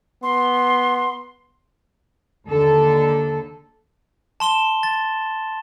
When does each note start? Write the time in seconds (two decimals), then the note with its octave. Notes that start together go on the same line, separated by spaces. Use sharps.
0.23 B3 C6
2.46 D#2 D3 A4
4.40 A5 C6 E7 G7
4.83 A6